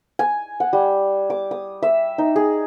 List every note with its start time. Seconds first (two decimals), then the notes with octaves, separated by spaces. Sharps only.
0.19 G#5
0.60 F#5
0.73 G3
1.30 D6
1.51 D#6
1.83 E5
2.18 D#4
2.36 G#4